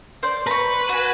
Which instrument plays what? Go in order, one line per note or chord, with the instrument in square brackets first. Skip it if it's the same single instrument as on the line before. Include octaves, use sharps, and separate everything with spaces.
[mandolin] C5 D5
[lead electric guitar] B4 [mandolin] A#5 C#6
[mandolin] F#4 G#5